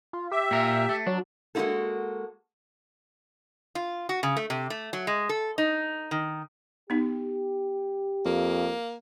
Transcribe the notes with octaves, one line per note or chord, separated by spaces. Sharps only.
F4
G4 E5
A#2 A#4
A3
F#3 D4
G#3 A#3 C#4 E4 F#4 A4
F4
F#4
C#3
A3
C3
A3
F#3
G#3
A4
D#4
D#3
B3 D#4 G4
F2 A#3